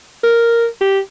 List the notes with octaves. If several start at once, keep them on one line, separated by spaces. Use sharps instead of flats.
A#4
G4